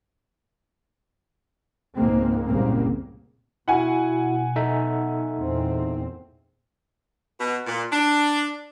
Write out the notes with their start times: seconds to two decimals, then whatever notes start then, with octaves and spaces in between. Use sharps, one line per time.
1.96 C#2 G#2 G#3 A#3 C4
2.46 F#1 C2 A#2 C#3 A#3 C4
3.68 B2 E4 F#4 F#5 G#5
4.56 D#4 A4 E5
5.36 E2 A#2 C4
7.39 B2
7.67 A#2
7.92 D4